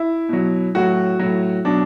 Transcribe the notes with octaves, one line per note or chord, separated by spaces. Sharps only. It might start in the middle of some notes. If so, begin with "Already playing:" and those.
Already playing: E4
B2 F#3
A2 F#3 F#4
A2 F#3
B2 F#3 D4